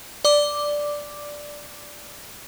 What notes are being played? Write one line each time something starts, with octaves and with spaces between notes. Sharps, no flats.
D5 D6